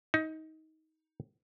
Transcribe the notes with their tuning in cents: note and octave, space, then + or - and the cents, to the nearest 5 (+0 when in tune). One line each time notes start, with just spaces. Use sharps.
D#4 +25